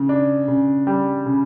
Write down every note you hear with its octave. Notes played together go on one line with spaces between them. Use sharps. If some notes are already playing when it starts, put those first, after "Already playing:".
Already playing: C#3
D4
C#3
G3
C#3